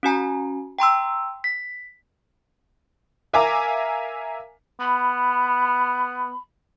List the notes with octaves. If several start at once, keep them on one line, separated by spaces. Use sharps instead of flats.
C#4 F#4 G#5 A#5
G5 A#5 C6 E6
B6
A#4 E5 F5 G#5 A#5 D6
B3 B5